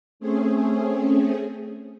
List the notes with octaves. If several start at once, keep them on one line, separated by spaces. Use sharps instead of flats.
A3 C4 C#4 G#4